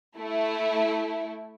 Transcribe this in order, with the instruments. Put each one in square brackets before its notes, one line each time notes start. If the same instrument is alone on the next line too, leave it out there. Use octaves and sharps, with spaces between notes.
[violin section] A3 E4